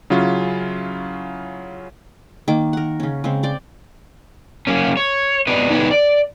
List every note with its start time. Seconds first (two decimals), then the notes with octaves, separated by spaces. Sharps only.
0.10 C#3 F#3 C#4 E4 F4
2.48 D#3 A#3 D6
2.73 A#4 F#5
3.00 C#3 C#4
3.24 C#3 G#3 C4
3.43 C5 D5 G5
4.67 F#3 A#3 C#4
4.97 C#5
5.47 B3 D4 B4 D#5
5.70 D#3 B3 D4 D#4 B4 C#5
5.91 D5